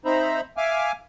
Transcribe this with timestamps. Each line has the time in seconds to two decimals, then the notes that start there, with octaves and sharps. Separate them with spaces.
0.05 C4 D#4 C5 E5 A#5 B5
0.57 E5 F5 G#5 D6 F6